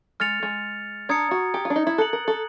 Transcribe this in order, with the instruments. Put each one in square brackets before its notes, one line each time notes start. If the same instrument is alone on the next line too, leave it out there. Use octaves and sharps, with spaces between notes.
[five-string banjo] G#3 [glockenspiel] F6 A6 C#7 F7
[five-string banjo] G#3
[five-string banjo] D4 [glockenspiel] A#5 D#6 G#6 C#7
[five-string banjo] F#4
G4
F4
D4
D#4
E4
[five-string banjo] A4 [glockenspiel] F#6 A6 C#7 F#7
[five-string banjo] A#4
A4